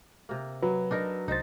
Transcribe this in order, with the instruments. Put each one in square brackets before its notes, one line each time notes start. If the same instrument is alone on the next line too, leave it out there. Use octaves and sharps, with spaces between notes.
[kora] C3 A#3
[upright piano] F#3 [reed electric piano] B4
[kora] D4 D#4 A#4
[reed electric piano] C2 A6 [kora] D#4 C5